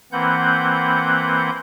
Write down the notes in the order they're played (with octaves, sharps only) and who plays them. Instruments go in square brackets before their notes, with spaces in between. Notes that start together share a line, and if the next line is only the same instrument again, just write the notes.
[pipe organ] E3 A#3 C4 B4 F#5 G6